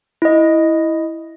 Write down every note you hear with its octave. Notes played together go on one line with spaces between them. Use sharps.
E4 D#5